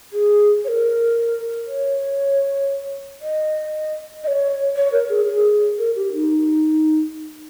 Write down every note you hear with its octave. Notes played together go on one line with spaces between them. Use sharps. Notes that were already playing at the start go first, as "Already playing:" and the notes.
G#4
C#5
A#4
C#5
D#5
D#5
C#5
C#5
A#4
G#4
G#4
A#4
G4
D#4